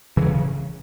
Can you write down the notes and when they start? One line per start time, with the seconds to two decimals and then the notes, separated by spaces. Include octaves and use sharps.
0.17 C#3 E3